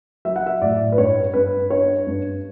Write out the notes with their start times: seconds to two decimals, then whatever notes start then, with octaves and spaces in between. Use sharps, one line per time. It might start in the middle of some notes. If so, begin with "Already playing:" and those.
0.25 F#3 E5
0.36 F#5
0.46 E5
0.61 A2 D5
0.92 B4
0.98 G2 C#5
1.34 G2 B4
1.70 D4 C#5
2.07 G2